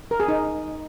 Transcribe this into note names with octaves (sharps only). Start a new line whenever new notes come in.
A#4
G#4
D#4